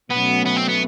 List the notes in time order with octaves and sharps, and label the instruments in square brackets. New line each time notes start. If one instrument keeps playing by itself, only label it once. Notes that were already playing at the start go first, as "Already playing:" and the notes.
[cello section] B2 F#3 A3 C#4 [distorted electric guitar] B3
[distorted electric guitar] B3
C4
B3